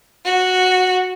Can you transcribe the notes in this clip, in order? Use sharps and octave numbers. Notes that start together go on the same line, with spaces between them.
F#4